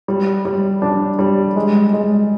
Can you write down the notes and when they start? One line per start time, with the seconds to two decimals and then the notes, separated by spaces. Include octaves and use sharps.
0.08 G3
0.45 G3
0.82 D4
1.19 G3
1.56 G#3
1.93 G#3